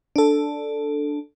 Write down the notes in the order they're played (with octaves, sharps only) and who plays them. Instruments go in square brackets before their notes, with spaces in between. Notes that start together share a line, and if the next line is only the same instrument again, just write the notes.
[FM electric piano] D4 A4